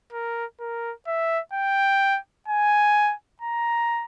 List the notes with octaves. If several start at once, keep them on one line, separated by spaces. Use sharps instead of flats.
A#4
A#4
E5
G5
G#5
A#5